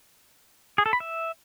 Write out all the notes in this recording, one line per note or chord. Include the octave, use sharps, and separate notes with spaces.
G#4
A4
B5
E5